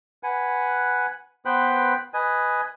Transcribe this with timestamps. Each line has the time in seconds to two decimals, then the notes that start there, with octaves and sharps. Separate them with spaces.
0.23 B4 F#5 G#5
1.45 B3 B4 C5 G5 B5 F#6
2.14 B4 D#5 G#5